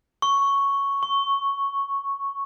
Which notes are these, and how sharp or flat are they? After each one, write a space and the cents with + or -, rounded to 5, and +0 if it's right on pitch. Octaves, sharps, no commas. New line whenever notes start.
C#6 +0
C#6 -10